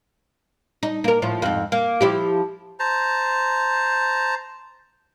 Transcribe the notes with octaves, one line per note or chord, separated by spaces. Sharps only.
D#4
A#3 A#4
A2 F3
F2 G#2
A#3
F3 E4 G4
C5 A5 A#5